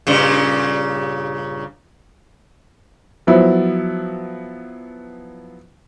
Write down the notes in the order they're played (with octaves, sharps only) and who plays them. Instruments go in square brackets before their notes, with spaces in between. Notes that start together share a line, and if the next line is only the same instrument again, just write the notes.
[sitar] G2 A#2 C#3
[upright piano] F3 F#3 B3 E4